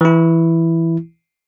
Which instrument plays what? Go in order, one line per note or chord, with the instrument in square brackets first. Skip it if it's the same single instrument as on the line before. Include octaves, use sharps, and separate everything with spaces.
[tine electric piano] E3 E4